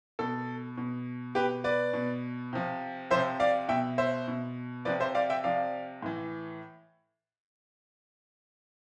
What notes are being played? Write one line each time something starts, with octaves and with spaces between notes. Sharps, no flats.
B2 A4
B2
B2 G4 B4
B4 D5
B2
C3 F3
C3 F3 C5 E5
D5 F5
B2 E5 G5
C5 E5
B2
C3 F3 B4 D5
C5 E5
D5 F5
E5 G5
C3 F3 D5 F5
A2 E3